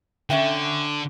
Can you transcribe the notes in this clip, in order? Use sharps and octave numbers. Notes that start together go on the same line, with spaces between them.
D3 C#4 E5 G5